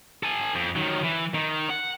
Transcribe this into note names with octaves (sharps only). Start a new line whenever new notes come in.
A4 G#5
F2
D#3 F#3
E3
D#3
F#5